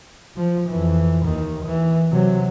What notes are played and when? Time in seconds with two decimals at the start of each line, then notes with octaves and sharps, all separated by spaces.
0.36 F3
0.68 F2 E3
1.25 D#2 D#3
1.64 E3
2.12 C3 F#3